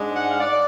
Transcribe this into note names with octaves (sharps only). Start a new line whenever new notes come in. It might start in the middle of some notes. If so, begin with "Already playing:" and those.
Already playing: G#2 G#3 D4
F#5
F5
D5